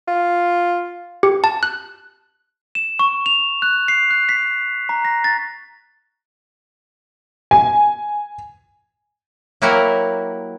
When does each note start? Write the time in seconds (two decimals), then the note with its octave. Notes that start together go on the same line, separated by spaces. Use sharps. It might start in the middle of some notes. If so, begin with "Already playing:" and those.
0.07 F4
1.23 G4
1.44 A5
1.63 F#6
2.75 E7
2.99 C#6
3.26 F7
3.62 F#6
3.88 C7
4.11 F#6
4.29 B6
4.89 A#5
5.05 A#6
5.24 A6
7.51 G#5
9.62 F#3 A#3 E4 F#4 G4 A#4